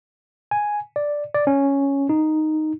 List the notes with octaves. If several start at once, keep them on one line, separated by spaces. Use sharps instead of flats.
G#5
D5
D5
C#4
D#4